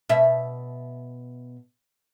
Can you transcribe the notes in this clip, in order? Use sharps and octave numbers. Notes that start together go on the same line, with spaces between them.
B2 E5